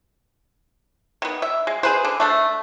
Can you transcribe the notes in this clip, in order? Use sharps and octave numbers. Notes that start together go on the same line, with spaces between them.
D#3 B3
E5
G#3
G#4 B4 C5
D3
A3 D4 A4